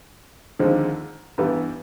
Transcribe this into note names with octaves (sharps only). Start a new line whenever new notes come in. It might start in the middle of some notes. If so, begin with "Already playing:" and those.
D#2 D3 F3 G#3 C4
G2 E3 G3 B3